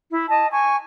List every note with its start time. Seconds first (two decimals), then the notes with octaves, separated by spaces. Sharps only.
0.10 E4
0.29 D#5 A5
0.51 G#5 C#6